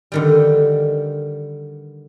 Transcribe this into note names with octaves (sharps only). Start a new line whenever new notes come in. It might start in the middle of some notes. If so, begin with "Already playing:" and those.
D3 D#3 G3